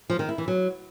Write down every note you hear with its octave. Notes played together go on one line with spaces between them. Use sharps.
F3
D#3
E4
E3
F#3